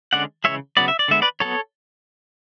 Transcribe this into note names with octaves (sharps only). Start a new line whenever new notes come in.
D3 G#3 C#4 D5 F#5
C#3 E3 G#3 C#5 E5
C#3 F#3 B3 D5
E5
D5
D3 G#3 B3 E5
B4 D5
F#3 B3 A4 C#5